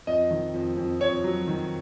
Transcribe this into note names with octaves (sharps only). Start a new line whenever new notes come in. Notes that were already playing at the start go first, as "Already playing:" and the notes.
F2 D#5
D#3
F2
F2
F2 C#5
F#3
D#3